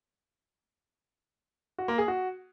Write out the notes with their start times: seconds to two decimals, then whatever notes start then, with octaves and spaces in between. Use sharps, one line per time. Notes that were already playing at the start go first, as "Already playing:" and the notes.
1.78 F#4
1.88 A#3
1.98 G#4
2.08 F#4